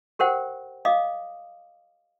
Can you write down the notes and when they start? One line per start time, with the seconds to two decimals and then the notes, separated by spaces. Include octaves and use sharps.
0.19 G4 A#4 C5 F#5 G5
0.85 D#5 F5 D6 D#6